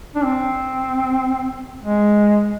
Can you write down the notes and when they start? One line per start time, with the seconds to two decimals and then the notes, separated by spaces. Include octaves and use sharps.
0.15 D4
0.24 C4
1.83 G#3